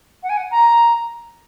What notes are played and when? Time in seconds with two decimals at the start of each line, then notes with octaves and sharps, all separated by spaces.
0.23 F#5
0.29 G#5
0.37 F#5
0.51 A#5